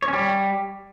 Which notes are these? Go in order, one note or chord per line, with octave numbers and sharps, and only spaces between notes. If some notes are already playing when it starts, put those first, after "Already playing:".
C#5
C#4
G3